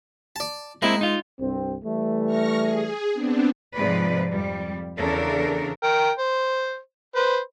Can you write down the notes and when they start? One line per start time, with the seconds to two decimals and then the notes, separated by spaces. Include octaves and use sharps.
0.36 D5 A5
0.82 G#3 A#3 C4 E4
1.01 D#4 F4
1.40 C2 G2 C4
1.84 E3 G3 A3
2.25 C#6 F6 A#6
2.58 G#4
3.13 B3 C4 D4
3.75 G#2 C3 F3 G#3 B4 D5
4.29 F2 G3
4.96 E2 C#3 D4 A4 A#4
5.83 A#4 G5
6.19 C5
7.15 B4 C5